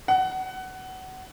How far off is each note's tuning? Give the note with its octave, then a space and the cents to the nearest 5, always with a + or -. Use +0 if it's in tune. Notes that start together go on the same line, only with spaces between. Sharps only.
F#5 +20